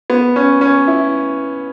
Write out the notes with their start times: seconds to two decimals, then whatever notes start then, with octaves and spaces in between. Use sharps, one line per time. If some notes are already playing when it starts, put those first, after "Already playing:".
0.10 B3
0.36 C#4
0.61 C#4
0.88 E4